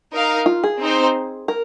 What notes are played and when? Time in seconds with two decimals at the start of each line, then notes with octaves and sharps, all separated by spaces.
0.13 D#4 A#4 F5
0.46 F4
0.64 G#4
0.80 C4 D#4 C5
1.48 A#4